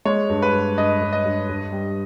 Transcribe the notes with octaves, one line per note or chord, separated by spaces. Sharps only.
G#3 C#5
G2
B4
G2
G2 D#5
G2
D#5
G2
G2
G3